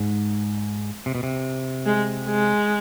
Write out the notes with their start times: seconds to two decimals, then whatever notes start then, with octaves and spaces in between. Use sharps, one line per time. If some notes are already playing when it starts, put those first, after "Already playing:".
Already playing: G#2
1.06 C3
1.15 B2
1.23 C3
1.86 G#3
2.27 G#3